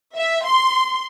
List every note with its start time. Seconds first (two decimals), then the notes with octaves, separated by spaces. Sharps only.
0.15 E5
0.46 C6